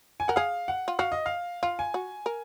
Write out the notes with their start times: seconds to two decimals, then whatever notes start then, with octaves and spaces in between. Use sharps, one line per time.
0.20 G#5
0.28 A#4 F#5
0.36 G#4 F5
0.68 F#5
0.88 F4
0.99 F#4 F5
1.12 D#5
1.26 F5
1.63 F4 F5
1.79 G#5
1.94 F#4
2.26 A#4